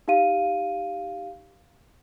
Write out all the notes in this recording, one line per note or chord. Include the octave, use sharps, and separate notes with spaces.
D#4 G4 F5 D#7